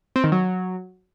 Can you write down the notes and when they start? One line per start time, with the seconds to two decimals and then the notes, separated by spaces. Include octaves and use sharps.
0.16 C4
0.24 D#3
0.32 F#3